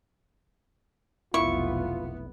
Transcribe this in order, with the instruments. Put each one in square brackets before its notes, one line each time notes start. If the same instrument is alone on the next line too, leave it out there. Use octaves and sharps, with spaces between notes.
[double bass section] F1 B1 B3 [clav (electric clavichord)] E4 [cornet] F4 [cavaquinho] C#6